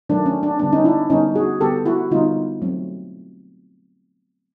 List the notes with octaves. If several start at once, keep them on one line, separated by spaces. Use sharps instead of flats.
D#3 F#3 A3 D4
C#4
D4
D3 G3 B3 D4
C#4 D#4
D4 E4
D3 G3 B3 C#4 D#4
F#4 G#4
D3 G3 B3 G4 A4
E4 F#4
D3 G3 B3 D#4 F4
F#3 A3 C4